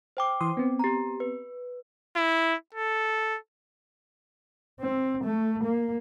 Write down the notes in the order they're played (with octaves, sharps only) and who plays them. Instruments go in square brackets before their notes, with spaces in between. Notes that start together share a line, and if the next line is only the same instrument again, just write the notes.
[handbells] C5 G5 D6
[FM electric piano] E3 C6 D#6
B3 C4
[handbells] G4 A#5
B4
[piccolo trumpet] E4
A4
[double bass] C4
A3
A#3